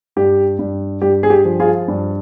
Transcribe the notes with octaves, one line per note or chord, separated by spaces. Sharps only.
G2 G4
G2
G2 G4
G#4
G4
F3
F4 G#4
G2